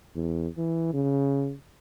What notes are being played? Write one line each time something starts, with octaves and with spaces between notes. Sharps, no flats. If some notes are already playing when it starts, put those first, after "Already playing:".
E2
E3
C#3